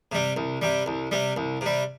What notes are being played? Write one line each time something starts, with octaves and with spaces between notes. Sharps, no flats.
C3 G3
C2
C3 G3
C2
C3 G3
C2
C3 G3